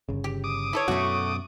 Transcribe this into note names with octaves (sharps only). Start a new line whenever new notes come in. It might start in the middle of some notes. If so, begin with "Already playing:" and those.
G1 C#3
G4
D6 D#6
E4 A4 C#5
F#2 B2 A3 F#4